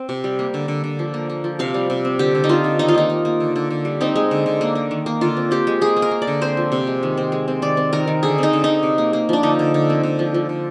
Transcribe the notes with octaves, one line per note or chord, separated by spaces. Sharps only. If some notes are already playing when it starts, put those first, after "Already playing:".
Already playing: C4
C3
G3
A#3
D3
D3
D3
F3
A#3
A#3
F3
C3 F5
G3
C3
C4
D3 G4
D3
D#4
C4 F4
D3
D#3 D#4
F4
A#3 D#4
A#3
A#3
D3
D3
D3
G3
C4 D#4
G#3
D3
D3
A#3
A#3
D#3
A#3
D3 F4
C4
C4 G4
G#3
A#3 G#4
A#3
A#4
A#3
D5
D3
C4 C5
F3
C3
G#3
D#3
C4
G#3
C4
D#3 D5
C4
D#3 A#4
D#3
D3 G#4
C4 D#4
D3
D3 D#4
C3
A#3
A#3
F3 D4
D3 D#4
D3
D3
C4
D3
F3
F3
D3